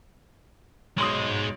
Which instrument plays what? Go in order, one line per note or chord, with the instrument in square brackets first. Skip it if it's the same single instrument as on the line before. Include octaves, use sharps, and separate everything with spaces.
[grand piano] B1 C6 D#6 [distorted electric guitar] G#3 D#4